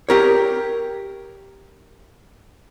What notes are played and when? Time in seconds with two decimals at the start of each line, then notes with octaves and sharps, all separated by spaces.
0.09 G4 A#4 C#5